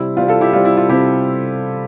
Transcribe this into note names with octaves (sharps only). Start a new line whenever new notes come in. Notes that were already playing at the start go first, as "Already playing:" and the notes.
Already playing: C3 G3 C4 E4
C3 G3 C4 F4
F4 A4
E4 G4
C3 G3 C4 F4
E4
F4
C3 G3 C4 E4 G4